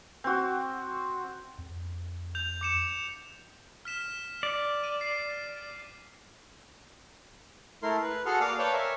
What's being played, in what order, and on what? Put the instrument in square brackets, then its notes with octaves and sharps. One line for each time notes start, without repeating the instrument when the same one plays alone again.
[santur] C4 F#4
[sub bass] F2
[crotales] G6 F7
D6 C#7 E7
F6 B6 E7
[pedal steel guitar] D5
[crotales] D#7
C7
[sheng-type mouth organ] A3 E4 A#4 C6
B4
F#4 G#4 A4 F#5 C6 F6
A#3 D5 F5 D#6 F6
B4 C#5 D5 F5 G5 A5
A#4 C#5 E5 G#5